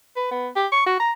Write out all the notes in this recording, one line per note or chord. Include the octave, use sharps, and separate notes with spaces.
B4
B3
G4
C#6
F#4
A#5